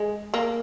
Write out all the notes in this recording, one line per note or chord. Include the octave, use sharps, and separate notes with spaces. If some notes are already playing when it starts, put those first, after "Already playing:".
Already playing: G#3
A#3